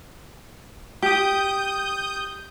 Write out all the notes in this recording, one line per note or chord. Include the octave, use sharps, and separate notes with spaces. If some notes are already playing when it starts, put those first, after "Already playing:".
G4 D#6 G6